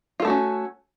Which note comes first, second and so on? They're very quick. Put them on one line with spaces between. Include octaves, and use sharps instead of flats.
F4 A4 A3 F#4 C#4